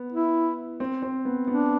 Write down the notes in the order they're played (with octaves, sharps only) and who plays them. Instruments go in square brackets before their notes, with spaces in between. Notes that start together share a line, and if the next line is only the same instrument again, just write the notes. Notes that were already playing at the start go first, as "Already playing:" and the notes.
Already playing: [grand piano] B3
[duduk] E4
[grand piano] C4
C4
B3
[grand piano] B3 [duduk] D4